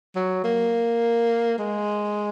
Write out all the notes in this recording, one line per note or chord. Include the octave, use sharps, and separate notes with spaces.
F#3
A#3
G#3